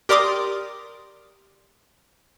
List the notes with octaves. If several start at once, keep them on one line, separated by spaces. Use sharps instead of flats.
G4 A#4 D5 C6 D6 D#6